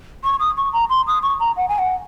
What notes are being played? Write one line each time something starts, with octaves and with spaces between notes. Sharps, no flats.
C#6
D#6
C#6
A#5
C6
D#6
C#6
A#5
F#5
G#5
F#5